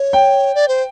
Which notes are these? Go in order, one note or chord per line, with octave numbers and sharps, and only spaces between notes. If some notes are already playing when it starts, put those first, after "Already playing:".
Already playing: C#5
G5
D5
C5